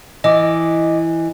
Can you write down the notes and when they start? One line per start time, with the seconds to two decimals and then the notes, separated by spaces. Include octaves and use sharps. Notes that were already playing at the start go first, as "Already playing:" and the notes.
0.24 E3 D#5 D6